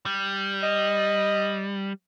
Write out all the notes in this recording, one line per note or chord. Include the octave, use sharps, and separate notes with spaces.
G3
D#5